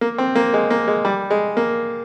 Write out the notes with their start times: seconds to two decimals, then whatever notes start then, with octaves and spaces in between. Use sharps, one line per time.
0.01 A#3
0.18 C4
0.35 A#3
0.54 G#3
0.70 A#3
0.88 G#3
1.05 G3
1.31 G#3
1.57 A#3